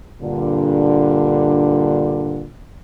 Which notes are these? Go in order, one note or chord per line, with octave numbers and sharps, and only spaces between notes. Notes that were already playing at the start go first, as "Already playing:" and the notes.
G2 A#2 D3